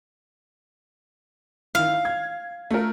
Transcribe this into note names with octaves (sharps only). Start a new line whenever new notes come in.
D#3 E4 F5
G#6
A3 F4 A#4